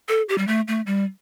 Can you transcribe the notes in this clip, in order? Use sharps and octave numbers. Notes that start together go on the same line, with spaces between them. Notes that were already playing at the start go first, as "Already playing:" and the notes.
A4
G4
G3
A3
A3
G3